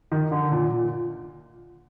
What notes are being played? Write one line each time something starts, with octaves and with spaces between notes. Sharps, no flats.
D#3
D3
A#2
A#2